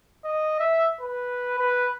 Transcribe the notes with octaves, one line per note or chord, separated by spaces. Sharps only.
D#5
E5
B4
B4